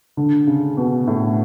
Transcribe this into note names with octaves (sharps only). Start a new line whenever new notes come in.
D3
C#3
B2
A2